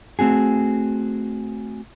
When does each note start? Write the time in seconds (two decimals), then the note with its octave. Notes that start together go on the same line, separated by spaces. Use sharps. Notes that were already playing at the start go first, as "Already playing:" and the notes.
0.19 A3 C4 F#4 G#4